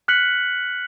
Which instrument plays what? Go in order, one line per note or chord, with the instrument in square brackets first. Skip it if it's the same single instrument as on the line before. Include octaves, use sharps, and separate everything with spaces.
[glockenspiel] F6 F#6 B6 C#7 F#7